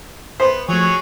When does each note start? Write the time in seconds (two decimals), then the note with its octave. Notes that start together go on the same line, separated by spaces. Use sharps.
0.40 B3 C5
0.69 F3 F#3 A3 G#4 C#5